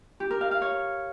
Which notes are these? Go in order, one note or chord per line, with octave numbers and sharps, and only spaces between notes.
G4
A#4
F5
F5
C#5